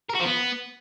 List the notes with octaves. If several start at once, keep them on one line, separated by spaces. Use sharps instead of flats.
A#4
F#4
F3
B3